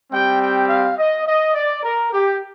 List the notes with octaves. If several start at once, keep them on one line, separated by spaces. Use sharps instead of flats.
G3 C4 G4 G5
G5
F5
D#5
D#5
D5
A#4
G4